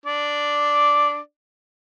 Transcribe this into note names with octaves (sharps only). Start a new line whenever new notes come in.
D4 D5